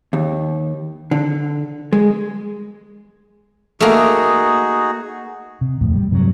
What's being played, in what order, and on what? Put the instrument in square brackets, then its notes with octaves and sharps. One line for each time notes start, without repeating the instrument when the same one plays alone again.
[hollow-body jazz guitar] D#2
D3
G#3
[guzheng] A3 A#3 [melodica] D#4 F#4 G#4
[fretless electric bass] C3
D#1 F2 A2
G3
G2 C3 D#3 F#3